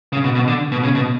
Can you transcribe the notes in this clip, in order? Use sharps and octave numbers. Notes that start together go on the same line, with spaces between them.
C#3
B2
B2
D3
B2
C#3
B2